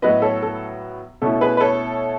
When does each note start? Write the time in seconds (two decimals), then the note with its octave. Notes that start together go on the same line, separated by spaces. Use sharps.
0.02 A2 F#3 B3 B4 D#5
0.22 A4 C#5
0.42 A4
1.22 B2 A3 C#4 E4 A4
1.41 G#4 B4
1.57 B4
1.60 A4 C#5